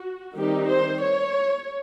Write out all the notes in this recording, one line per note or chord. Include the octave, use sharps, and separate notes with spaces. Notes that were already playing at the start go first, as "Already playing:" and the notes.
Already playing: F#4
D#3 G3 C4 D#4 G4
C5
C#5